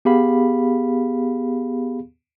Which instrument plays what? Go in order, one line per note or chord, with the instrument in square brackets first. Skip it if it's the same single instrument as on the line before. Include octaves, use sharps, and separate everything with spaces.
[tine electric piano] B3 G4 G#4 F5 B5